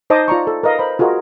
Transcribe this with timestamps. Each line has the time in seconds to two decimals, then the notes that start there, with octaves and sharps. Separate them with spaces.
0.10 D#4 C5 D#5 A5 D6 D#6
0.28 F4 D5 A#5 C#6
0.47 A4
0.63 A#4 B4 D#5 F5
0.79 C5 B5
0.99 F4 F#4 G#4 A#4 D#5